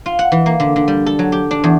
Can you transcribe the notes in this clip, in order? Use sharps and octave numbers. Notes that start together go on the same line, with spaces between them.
F4
F#5
E3
A#3
D3
D3
G3
A4
F#3
G4
D4
E2